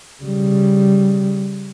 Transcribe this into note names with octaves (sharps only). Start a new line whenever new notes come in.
C#3 G3